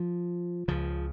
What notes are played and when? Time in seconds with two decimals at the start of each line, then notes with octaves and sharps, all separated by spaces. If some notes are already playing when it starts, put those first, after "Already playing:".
Already playing: F3
0.68 C#2 C#3 F3